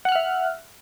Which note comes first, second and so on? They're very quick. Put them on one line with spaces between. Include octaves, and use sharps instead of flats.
F#5 F#6 F6 E5